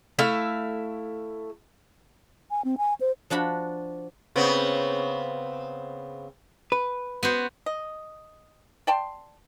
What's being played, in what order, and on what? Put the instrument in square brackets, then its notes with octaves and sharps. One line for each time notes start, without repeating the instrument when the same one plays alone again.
[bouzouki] A3 E4 E5 F5
[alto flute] G#5
C4
G#5
C5
[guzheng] F3 D4 F#4 B5
[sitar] C#3 B3 C4
[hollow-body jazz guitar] B4
[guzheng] B3 F#4 C5
[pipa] D#5
D5 G5 A5 C6